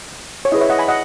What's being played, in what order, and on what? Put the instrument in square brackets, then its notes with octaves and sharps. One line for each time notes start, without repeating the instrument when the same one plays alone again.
[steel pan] C#5
E4 G#4 B4 D#5
C#5 E5
D#5 F#5
G#5 B5
D#5 F#5